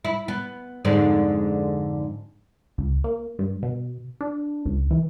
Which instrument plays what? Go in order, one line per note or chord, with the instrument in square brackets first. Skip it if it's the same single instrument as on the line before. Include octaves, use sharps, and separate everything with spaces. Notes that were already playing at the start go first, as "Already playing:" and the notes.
[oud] E4
B3
F2 G#2 D3
[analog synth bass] C#2
A#3
G2
B2
D4
C#2
E3